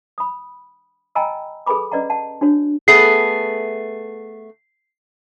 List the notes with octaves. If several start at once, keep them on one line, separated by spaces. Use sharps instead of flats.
B5 D#6
D#5 G5 G#5 A#5 B5 E6
G#4 A4 B4 G#5 B5 D6
C#4 B4 D5 D#5 F#5 A#5
F#5 A5
D4 F#4 C#5
A3 B3 G#4 C7